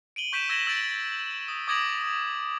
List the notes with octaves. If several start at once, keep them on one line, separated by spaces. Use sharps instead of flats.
D7 D#7 F#7 G7
C#6 G6 B6 D7 E7
E6 G#6 A#6 B6 E7 G7
E6 G6 A6 D7 F#7
D#6
D6 D#6 G#6 A#6 D7 F#7